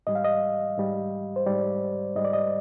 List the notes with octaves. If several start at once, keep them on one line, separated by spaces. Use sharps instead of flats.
G#2 G3 D#5
F5
D#5
G#2 G3
C5
G#2 G3 D5
G#2 G3 D#5
D5
D#5